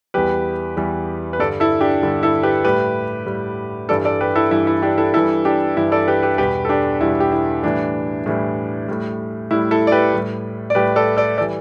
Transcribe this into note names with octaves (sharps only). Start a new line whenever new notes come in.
E2 E3 G3 G4 B4
E2 E3 G3
B4
G2 D3 G3 A4 D5
E4 A4
D4 G4
G2 D3 G3
E4 A4
G4 B4
A2 G3 G4 B4
A2 G3
G2 E3 G3 A4 D5
A4 D5
G4 B4
E4 A4
G2 E3 G3 E4
E4
D4 G4
E4 A4
G2 E3 G3 E4 A4
D4 G4
G2 E3 G3 E4
A4 D5
G4 B4
G4 B4
E2 B2 G3 G4 B4
A4
D4 G4
E2 B2 G3 E4
G4
E4
A2 E3 G3 D4
A2 E3 G3
A2 G3
A2 G3 E4
E4 A4
D5
G4 B4
A2 G3
D5
A2 G3 G4 B4
A4 D5
A4 D5
A4 D5
E3 G3